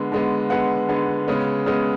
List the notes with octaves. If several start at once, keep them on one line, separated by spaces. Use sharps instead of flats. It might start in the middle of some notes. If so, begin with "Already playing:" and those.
Already playing: D3 G#3 B3
D3 G#3 B3
D3 G#3 B3 F#5
D3 G#3 B3
C#3 G#3 B3
C#3 G#3 B3